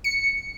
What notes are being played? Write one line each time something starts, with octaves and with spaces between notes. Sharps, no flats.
C#7